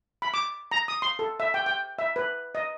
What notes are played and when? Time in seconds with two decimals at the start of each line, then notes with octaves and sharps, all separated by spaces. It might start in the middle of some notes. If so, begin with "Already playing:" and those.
0.22 B5
0.34 D6
0.71 A#5
0.88 D#6
1.02 C6
1.19 A4
1.40 E5
1.54 G5
1.66 G5
1.99 E5
2.16 B4
2.55 D#5